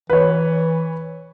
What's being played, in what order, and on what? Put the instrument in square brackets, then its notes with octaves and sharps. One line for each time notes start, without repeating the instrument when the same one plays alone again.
[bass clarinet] E3 [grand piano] B4 C#5